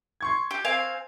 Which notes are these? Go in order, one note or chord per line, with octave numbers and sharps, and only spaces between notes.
C6 C#6 G#6
G4
C4 F5 G#5